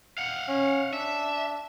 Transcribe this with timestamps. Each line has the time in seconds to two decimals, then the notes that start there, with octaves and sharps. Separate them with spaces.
0.18 F5 F#5
0.48 C#4
0.93 D4 E5